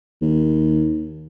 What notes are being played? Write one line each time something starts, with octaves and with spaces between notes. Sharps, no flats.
D#2